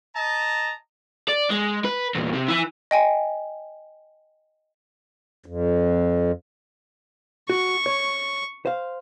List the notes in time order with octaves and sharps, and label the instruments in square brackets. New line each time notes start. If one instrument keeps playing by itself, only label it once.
[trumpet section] D#5 A5 A#5
[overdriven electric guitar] D5
G#3
B4
E2 A#2
C3
E4 G#5
[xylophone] D#5 G5 G#5
[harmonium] F2
[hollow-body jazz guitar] F#4 [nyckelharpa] C#6
[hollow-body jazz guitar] C#5
C5 F5